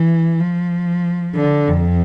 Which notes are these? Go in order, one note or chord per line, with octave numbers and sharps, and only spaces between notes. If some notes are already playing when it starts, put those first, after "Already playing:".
Already playing: E3
F3
D3
F2